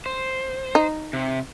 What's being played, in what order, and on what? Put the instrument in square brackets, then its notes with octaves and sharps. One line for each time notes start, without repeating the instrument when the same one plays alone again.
[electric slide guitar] C5
[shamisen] D#4
[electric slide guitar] C3